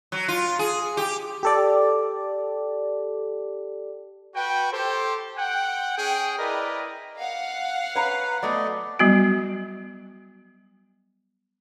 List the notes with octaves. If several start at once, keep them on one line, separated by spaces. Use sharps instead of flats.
F#3
F4
G#4
G4
G4 A4 D5
F#4 B4 G5
G4 A4 C5
F#5 G5
C#4 G#4 G5
E4 A#4 B4 D5 D#5
F5 F#5
B4 C#5 A#5
F#3 A3 B3 D5 D#5
F#3 G3 B3 F#4